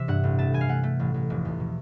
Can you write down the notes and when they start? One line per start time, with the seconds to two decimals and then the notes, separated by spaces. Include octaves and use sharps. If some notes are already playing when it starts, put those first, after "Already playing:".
Already playing: C3 E3 E5
0.08 G2 F#5
0.24 A1
0.39 A3 A5
0.53 E3 G#5
0.61 F5
0.69 A3 F#5
0.83 A3
1.00 A1
1.14 A1
1.30 F1
1.45 E2
1.60 B2